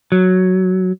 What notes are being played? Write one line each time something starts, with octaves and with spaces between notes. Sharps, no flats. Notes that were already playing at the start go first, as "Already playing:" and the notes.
F#3